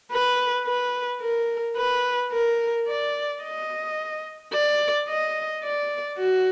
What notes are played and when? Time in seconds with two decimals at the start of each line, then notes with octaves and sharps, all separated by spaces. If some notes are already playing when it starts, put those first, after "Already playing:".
0.12 B4
0.67 B4
1.21 A#4
1.77 B4
2.32 A#4
2.88 D5
3.42 D#5
4.53 D5
5.08 D#5
5.64 D5
6.18 F#4